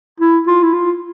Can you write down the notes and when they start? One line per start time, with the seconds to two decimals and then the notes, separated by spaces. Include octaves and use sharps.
0.20 E4
0.47 F4
0.63 E4
0.73 F4